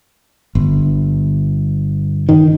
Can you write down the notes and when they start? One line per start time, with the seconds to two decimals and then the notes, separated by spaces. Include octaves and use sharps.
0.55 G1
2.29 D#3